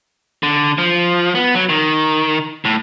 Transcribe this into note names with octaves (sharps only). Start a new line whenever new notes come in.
D3
F3
B3
F#3
D#3
A2